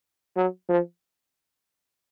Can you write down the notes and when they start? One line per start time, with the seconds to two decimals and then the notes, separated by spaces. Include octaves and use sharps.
0.36 F#3
0.69 F3